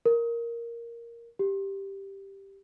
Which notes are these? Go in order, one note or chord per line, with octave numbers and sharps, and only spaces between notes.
A#4
G4